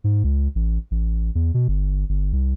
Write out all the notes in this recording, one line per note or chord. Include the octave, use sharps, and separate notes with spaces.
G#2
C#2
A1
A1
E2
B2
G1
G1
C2